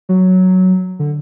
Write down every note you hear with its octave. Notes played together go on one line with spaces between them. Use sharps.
F#3
D3